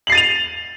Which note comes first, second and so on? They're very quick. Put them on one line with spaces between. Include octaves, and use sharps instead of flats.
F#7 C7 A6 D#7 F7